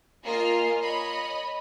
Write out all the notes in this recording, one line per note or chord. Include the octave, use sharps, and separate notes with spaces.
A#3 F4 D#5 G#5 F6 C7
C#5 D#5 B5